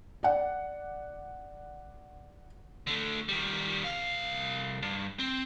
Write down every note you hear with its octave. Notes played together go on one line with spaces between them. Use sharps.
D5 F#5
D3 A3
D#3 G3
C2 F5
G2
C4